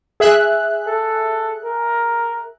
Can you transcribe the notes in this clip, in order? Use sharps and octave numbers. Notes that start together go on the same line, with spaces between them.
G#4 E5 F#6
A4
A#4